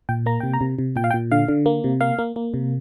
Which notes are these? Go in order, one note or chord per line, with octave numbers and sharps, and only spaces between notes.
A#2 G5
A#3 A#5
C3 G5
A#5
C3
C3
A#2 G5
F5
G5
A#2
D3 F5
D3
A#3
C3
A#3 F5
A#3
A#3
C3